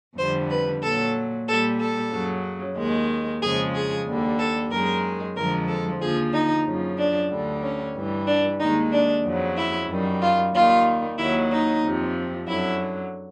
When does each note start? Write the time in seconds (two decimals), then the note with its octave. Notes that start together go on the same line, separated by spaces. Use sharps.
0.17 F2 D3 G3 C5
0.50 B4
0.82 A#2 F#3 A4
1.47 A#2 G3 A4
1.79 A4
2.11 F#2 C#3 F#3
2.76 D#2 D#3 G#3
3.41 F2 C#3 F3 G#3 G#4
3.74 G#4
4.06 D#2 D3 G3
4.39 A4
4.70 F#2 D#3 G#3 A#4
5.36 F2 D3 F3 G#3 A#4
5.68 A4
6.01 D#2 D3 F3 G#4
6.33 D#4
6.64 F#2 C#3 F3
6.97 D4
7.30 D2 D3 G3
7.62 C#4
7.94 G2 E3 G3
8.27 D4
8.59 D#2 D#3 G#3 D#4
8.91 D4
9.24 F2 C#3 F#3
9.56 E4
9.88 F#2 D#3 G3
10.21 F4
10.53 D#2 D#3 G3 F4
11.18 D#2 D#3 F#3 E4
11.50 D#4
11.83 F2 C3 F3
12.47 F#2 D3 F#3 E4